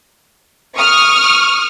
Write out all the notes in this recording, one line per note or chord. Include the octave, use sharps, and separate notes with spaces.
C#6 D#6 F6